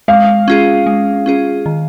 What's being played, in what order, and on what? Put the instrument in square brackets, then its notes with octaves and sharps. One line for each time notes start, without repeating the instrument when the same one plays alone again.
[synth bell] G#3 [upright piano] F5
[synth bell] C#4 F4 G#4
G#3
C#4 F4 G#4
D#3